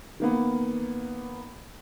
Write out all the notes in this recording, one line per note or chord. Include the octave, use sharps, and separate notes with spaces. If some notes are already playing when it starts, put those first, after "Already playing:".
D#3 A#3 B3